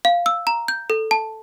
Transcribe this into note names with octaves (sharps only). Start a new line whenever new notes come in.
F5
E6
A#5
G6
A4
A5